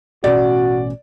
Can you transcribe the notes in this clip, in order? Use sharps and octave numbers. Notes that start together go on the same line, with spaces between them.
A1 B2 C#4 F#4 D5